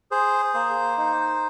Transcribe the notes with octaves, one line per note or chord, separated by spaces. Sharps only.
G#4 C5
A#3 C5
D#4